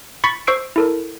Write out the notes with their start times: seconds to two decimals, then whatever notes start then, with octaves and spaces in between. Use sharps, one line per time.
0.24 B5 C#6 A6 B6 C#7
0.47 C5 C#6 E6 C7 D7
0.76 E4 A4 A#4